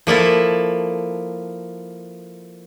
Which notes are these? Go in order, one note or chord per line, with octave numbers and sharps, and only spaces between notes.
F3 A#3 E4 A4